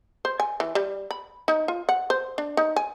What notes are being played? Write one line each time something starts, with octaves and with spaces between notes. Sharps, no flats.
C5
G#5
E3
G3
B5
D#4
F4
F#5
C5
D4
D#4
G#5